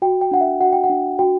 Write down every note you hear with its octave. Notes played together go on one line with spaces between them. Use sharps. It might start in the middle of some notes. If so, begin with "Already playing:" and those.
F#4 G5
G5
D4 F#5
E5
F#4 F#5
G5
F#5
D4
F#4 G5